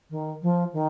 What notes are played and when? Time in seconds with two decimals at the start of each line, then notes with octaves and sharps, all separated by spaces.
0.10 D#3
0.42 F3
0.73 D#3